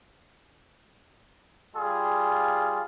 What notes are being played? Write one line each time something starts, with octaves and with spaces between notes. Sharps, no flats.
G3 F4 G#4